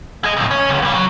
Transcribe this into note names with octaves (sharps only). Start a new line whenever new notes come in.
G#4 D#5
C#2 A2
C#4
C#2
C2 G3
F#3